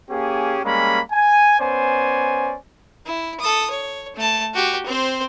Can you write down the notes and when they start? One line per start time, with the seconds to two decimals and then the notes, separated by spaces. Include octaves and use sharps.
0.11 A#3 C#4 G4 G#4
0.65 G3 G#3 A#3 C#4 B5
1.11 G#5
1.60 B3 C#4 C5 D5 G#5
3.06 E4
3.40 A4 D#6
3.70 C#5
4.16 A3 A5
4.54 F#4 G4
4.86 C4 C5